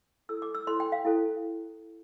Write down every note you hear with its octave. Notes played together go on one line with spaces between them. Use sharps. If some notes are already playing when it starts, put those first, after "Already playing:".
E4 A4 C5 E6
D6
E6
E4 A4 C5 C6
G5
F5
E4 A4 C5